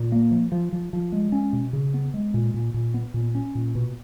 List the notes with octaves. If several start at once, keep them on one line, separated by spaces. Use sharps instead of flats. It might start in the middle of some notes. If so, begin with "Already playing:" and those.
Already playing: A#2
A#3
F3
F3
F3
F3
G#3
C#4
B2
C#3
B3
G#3
A#2
A#2
A#2
B3
A#2
C#4
A#2
B2